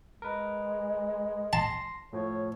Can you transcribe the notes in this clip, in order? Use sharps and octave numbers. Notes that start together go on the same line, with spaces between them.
G#3 A#4 B4
A5 C6 A#6 C7
A2 F3 C#5